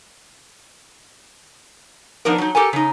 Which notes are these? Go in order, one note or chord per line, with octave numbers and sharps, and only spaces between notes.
F3 B3 D4 D#4 A#4
F#3 D#4
G4 A4 A#4 G#5
C#3 D#4